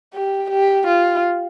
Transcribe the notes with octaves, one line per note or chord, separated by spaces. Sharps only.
G4
G4
F4